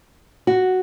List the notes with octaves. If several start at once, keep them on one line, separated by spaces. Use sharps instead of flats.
F#4